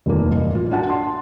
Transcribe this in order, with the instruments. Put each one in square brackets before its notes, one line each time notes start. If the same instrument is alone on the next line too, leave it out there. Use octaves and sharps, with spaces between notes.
[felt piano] F1 D#2 A#3
A1
F4
D4 F#4 F#5 A5
C6